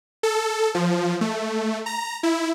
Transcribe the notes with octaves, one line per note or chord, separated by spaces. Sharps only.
A4
F3
A3
A#5
E4